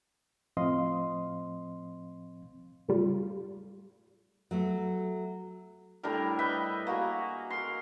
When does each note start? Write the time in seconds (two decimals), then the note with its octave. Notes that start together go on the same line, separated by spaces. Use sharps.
0.57 A2 F3 C4 D#5 F5 C6
2.88 A2 C#3 G3 F4
4.51 F#3 A3 B3
6.03 A2 G3 D4 A#4
6.39 B4 D#5 E5 G5
6.87 A#3 F#4 G#4 A#5
7.50 A#4 C6